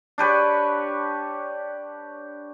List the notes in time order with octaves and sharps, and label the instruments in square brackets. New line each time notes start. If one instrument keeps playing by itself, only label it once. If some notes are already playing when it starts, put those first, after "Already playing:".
[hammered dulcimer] D4 G4 B4 C#5